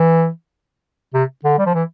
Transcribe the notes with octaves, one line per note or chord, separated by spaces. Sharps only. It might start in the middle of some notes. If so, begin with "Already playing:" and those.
Already playing: E3
C3
D3
G3
F3
E3